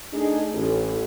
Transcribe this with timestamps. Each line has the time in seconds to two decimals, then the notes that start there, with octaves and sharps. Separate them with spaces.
0.13 A3 D4 D#4 G#4
0.54 A1